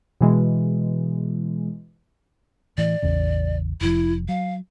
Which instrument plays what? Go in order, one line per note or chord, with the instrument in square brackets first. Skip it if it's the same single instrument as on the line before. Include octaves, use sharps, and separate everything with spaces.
[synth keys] B2 E3 G#3
[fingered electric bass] A2 E3 [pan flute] D5
[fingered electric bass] A1 E2 C#3
[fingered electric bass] F1 F3 [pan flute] E4
[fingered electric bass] F#3 [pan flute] F5